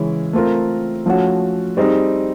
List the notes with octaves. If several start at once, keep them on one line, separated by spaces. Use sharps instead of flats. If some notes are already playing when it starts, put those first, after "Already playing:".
Already playing: C#3 E3 G#3 C#4 E4
A3 C4 F4 A#4
F3 A3 C#4 F#4
G3 C4 D#4 G#4